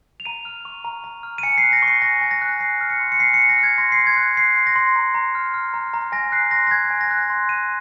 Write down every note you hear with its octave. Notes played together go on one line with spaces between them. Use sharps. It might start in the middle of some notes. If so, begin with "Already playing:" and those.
F7
A#5 D#7
F6
C#6
A#5
A#5
F6
D#7
G#5 C#7
C7
F#6
A#6
C#6
C7
G#5 A#6
G#5
A#6
F#6
G#5 C7
F6
C#7
C6
C#7
G#5 C7
C#7
G#5
A#6
F6
G#6
C6 A#6
C7
C6
G#6
F#6
F#6 C7
C6
A#6
C6
A#5
A#5
F6
F6
A#5
A#5
G#5 A#6
F#6 C7
C6 A#6
A#6
G#5 G#6
G#5
A#6
F#6
C6
F#6 D#7